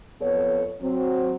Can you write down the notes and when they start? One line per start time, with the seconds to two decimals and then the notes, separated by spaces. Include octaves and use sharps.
0.21 F2 B3 A4 C#5
0.82 F#3 C4